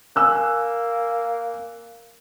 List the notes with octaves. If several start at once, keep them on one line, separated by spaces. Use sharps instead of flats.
A#3 G#5 E6 F#6